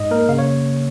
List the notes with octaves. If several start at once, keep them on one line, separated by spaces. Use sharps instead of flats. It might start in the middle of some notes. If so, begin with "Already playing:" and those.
Already playing: G#2 D#5
A#3 A#4
C#3 F5
C#5